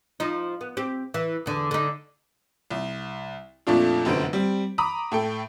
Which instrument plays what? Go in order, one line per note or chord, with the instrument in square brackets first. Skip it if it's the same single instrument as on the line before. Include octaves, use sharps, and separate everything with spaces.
[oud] F3 D#4
B3
C4 G4
E3
E2 D3
D3 D#4
[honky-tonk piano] C2
F2 A#2 A3 D4 F4
F1 F#2 B2 D3 C5 D7
G3 C4
A#5 B5 D6 D#6
A2 A4 G5